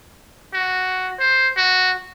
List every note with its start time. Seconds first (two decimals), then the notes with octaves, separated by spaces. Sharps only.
0.53 F#4
1.19 C5
1.56 F#4